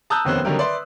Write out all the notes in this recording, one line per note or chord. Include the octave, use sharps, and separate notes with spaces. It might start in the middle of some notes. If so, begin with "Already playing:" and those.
A5 A#5 D#6 E6 F#6 G6
F1 D#2 B3 C#4 C5 F#6
D3 D#3 F#3 G3 A#3 C4
B4 D5 E5 C6